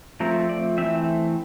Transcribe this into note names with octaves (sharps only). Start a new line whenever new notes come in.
F3 A3 C4 A#4
D5
E3 A3 C4 E5